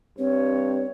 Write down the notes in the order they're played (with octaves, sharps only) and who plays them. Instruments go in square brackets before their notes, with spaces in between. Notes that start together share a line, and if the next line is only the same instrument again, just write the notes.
[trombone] G2 [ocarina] C4 [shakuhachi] C#5